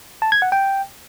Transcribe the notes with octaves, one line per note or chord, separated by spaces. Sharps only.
A5
G#6
F#5
G5